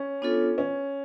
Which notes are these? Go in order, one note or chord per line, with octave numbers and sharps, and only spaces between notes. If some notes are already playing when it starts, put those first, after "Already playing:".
Already playing: C#4
B3 D4 F4 A4 C#5
C#4